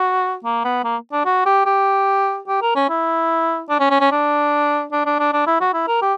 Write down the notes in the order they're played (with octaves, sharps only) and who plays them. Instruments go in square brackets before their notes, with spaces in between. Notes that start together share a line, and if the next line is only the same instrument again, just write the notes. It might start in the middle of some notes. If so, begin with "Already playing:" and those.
Already playing: [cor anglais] F#4
A#3
B3
A#3
D4
F#4
G4
G4
G4
A#4
C#4
E4
D4
C#4
C#4
C#4
D4
D4
D4
D4
D4
E4
F#4
E4
A#4
G4